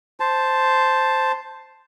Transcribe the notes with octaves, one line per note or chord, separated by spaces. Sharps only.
C5 A5